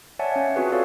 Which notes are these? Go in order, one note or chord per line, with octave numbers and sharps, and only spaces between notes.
C#5 D5 E5 F#5 G#5 A5
C#4 F5
C4 F4 F#4 G#4 B4
F#4 A4 C#5 D5 F5